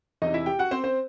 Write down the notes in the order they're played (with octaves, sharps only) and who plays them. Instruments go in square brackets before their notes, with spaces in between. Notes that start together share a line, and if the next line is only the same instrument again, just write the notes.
[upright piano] E2 C3 E3 D#4 D#5
E4 E5
G4 G5
F#4 F#5
C4 C5
C4 C5